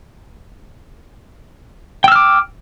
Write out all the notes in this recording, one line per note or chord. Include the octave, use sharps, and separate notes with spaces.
G5 D6 E6 F6